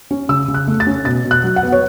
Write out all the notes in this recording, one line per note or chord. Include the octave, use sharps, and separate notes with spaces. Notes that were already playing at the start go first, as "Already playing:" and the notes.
C#4
C#3 E6
C#3
F#6
A3
A6
C#4
B2 A6
B2
F#6
F#3
F#5
B3
C#5